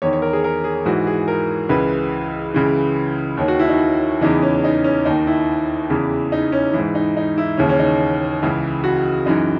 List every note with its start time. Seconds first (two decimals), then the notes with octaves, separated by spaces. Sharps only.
0.02 E2 D#3 C#5
0.13 C#5
0.22 A#4
0.33 G#4
0.44 A#4
0.64 G#4
0.85 G#2 E3 F#4
1.07 G#4
1.28 A#4
1.69 C#2 C#3 E3 B4
2.54 C#2 C#3 E3
3.37 D#2 D#3 C#5
3.48 F#4
3.59 E4
3.69 D#4
4.21 E2 C#3 E3 D#4
4.42 C#4
4.64 D#4
4.84 C#4
5.05 D#2 D#3 D#4
5.27 E4
5.90 E2 C#3 E3
6.32 D#4
6.52 C#4
6.73 G#2 E3
6.95 D#4
7.17 D#4
7.38 E4
7.58 D#2 C#3 E3 C#4
7.69 C#4
7.79 D#4
8.43 C#2 C#3 E3
8.84 F#4
9.26 F#2 E3 D#4